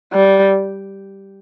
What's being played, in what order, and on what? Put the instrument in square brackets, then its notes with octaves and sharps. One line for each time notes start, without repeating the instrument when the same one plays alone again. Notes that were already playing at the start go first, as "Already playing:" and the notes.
[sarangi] G3